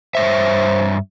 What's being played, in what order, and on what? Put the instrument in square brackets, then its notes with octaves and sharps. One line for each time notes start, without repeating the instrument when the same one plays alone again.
[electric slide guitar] G2 C#5 E5 [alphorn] C5